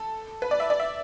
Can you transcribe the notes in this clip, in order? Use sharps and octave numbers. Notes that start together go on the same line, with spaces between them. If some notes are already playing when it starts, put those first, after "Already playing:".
Already playing: A4
B4
D5
E5
D5
E5